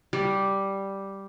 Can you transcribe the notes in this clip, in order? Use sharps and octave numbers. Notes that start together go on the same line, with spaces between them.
G3